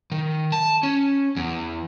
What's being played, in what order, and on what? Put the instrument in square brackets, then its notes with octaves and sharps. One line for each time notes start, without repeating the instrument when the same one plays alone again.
[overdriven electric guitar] D#3
A5
C#4
E2